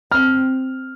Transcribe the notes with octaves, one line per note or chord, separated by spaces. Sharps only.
C4 F6